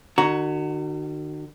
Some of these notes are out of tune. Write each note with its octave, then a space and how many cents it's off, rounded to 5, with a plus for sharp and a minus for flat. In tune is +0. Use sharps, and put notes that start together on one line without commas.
D#3 -45 F#4 +10 A#5 +0